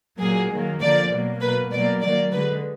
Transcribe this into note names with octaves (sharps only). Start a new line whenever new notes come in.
A#2 F#3 A#3 G#4
D#3 F#3 A#3
D3 F3 A#3 D5
B2 F#3 A#3
B2 A#3 B4
B2 F#3 A#3 D5
D#3 F#3 A#3 D5
D3 G#3 B4